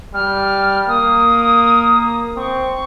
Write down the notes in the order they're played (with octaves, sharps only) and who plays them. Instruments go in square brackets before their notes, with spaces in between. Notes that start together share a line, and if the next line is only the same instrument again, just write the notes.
[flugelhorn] G3 [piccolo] F6
[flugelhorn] A#3 [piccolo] D#6
[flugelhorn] C4 [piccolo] C#6